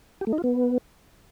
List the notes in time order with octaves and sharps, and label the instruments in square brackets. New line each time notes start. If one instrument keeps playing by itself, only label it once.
[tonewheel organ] G4
A3
D#4
F4
B3